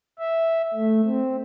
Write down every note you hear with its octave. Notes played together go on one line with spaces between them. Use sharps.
E5
A3
C4